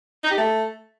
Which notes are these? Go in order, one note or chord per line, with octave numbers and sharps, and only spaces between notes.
D#4
G4
A3